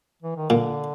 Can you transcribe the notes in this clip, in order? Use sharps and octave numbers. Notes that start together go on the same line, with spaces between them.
E3
D#3
A#2 D3